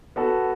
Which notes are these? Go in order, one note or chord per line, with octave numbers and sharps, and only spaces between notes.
B3 F#4 A4